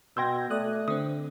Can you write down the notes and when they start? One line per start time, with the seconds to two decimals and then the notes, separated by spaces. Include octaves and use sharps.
0.17 B2 G5 C6 E6 G6 G#6 A#6
0.50 A3 D5 D#6 F#6
0.88 D3 C4 D#6